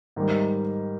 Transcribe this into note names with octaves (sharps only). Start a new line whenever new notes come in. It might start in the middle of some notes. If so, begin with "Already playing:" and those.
G#2 D#3 G3